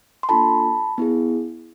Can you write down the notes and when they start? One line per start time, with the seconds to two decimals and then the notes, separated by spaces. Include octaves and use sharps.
0.23 C6
0.29 A#3 D4 F4 A4 A5 B5
0.98 B3 E4 G#4